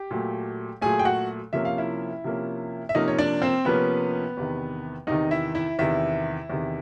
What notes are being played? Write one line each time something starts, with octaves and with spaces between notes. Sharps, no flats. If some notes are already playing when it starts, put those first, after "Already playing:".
Already playing: G4 G5
A#2 F#3 A3
A#2 F#3 A3 G#4 G#5
G5
F#4 F#5
C3 F3 A#3 C#4 E5
F5
E4 E5
C3 F3 A#3 C#4
E5
C3 F3 A#3 C#4 D#4 D#5
C#5
D4 D5
C4 C5
C3 F3 A#3 B3 C#4 B4
E2 C3 D#3
E2 C3 D#3 D#4 D#5
E4 E5
E4 E5
E2 C3 D#3 E4 E5
E2 C3 D#3